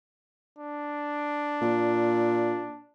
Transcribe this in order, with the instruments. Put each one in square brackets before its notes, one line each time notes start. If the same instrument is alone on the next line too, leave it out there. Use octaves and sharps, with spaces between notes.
[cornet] D4
[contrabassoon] A#2